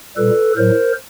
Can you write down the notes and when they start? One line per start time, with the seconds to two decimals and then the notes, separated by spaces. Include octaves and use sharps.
0.17 A#2 G3 A4 B4
0.57 A2 F#3 A#4 C5